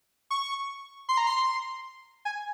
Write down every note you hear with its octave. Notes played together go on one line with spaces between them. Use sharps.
C#6
C6
A#5
C6
G#5